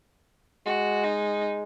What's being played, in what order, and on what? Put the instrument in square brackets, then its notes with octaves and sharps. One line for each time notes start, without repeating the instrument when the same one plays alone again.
[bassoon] G#3 [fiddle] F#4
[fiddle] D#4